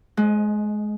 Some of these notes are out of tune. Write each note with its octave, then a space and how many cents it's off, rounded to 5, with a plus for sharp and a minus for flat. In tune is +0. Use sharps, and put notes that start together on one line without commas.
G#3 +25 D#5 +0